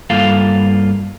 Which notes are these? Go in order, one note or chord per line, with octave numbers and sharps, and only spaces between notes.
G2 A#3 F4 A4 F5